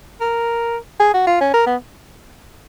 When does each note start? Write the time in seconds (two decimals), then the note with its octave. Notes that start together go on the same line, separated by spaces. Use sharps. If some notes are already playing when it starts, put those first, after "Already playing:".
0.21 A#4
1.00 G#4
1.14 F#4
1.27 F4
1.41 C#4
1.54 A#4
1.67 B3